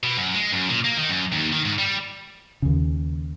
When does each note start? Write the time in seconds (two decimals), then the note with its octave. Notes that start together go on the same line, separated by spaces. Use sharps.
0.04 B2
0.17 F#2
0.34 G#3
0.52 F#2
0.69 A#2
0.85 A#3
0.97 D#3
1.09 F#2
1.32 D#2
1.52 D#3
1.65 G#2
1.78 G3
2.62 D#2 C#3